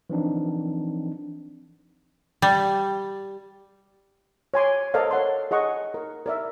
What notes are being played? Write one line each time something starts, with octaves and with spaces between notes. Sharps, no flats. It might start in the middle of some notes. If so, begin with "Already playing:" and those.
E3 F3 C4 D4 D#4
G3
C#5 G#5 C6 D6
A4 A#4 C5 D5 D#5 F5
C#5 F#5 C6
G#4 D#5 F#5 C#6
A#4
A#4 D5 E5